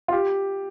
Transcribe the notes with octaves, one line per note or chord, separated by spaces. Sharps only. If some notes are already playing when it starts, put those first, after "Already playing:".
F4
G4